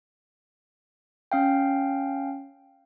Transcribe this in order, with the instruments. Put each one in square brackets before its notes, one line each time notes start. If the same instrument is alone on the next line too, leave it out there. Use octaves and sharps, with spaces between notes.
[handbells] C#4 F5 G5